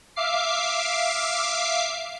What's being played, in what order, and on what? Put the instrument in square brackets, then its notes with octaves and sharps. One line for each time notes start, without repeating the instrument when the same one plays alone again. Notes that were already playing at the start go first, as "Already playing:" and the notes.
[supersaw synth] E5 F5 D6 C7